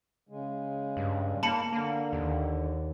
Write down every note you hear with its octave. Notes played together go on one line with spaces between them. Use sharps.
C#3 G#3
G2
A#3 A5 B5 C#7
D3 A#3
D#2